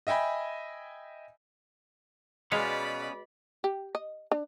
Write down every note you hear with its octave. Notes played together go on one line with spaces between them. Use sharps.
D#5 E5 G5 G#5 B5
B2 G#3 B3 C#4 D5 F5 B5
G4
D#5
D4